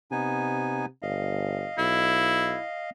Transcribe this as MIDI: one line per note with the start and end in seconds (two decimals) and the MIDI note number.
0.11 0.86 48
0.11 0.86 59
0.11 0.86 63
0.11 0.86 80
1.02 1.65 31
1.02 2.90 75
1.02 2.90 77
1.78 2.55 35
1.78 2.63 64